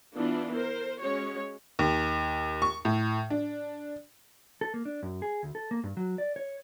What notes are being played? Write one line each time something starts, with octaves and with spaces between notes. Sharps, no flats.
E3 B3 D4 F4
A#4 C5
G#3 C#4 F#4 C#5
D#2
C#6
A2
D4
A4
A#3
D4
F#2
G#4
D2
A4
A#3
G2
F#3
D5
C#5